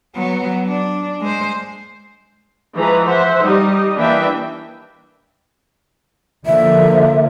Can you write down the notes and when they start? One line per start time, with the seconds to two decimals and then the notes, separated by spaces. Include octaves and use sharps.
0.16 F#3 B3
0.67 D4
1.22 G#3 C5
2.77 E3 F3 G#3 B4 A#5
3.06 C5 E5 F#5
3.43 G3 D#4 D#5
3.96 E3 A#3 D4 B4 E5 G5
6.46 D3 F3 A#3 E5